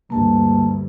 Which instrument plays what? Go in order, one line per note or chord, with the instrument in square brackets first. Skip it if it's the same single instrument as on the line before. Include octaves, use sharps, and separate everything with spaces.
[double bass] D2 G2 [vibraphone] A#3 A5